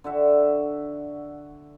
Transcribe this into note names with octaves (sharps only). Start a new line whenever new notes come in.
D3 F#4 E5